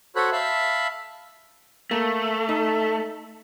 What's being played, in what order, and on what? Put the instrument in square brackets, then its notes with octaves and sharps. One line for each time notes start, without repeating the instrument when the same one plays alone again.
[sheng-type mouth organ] F#4 A4 C5 C#5 B5 F#6
E5 F5 A5 B5
[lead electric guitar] A3 [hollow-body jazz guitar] A#3 [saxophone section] A4
[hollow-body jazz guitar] D#4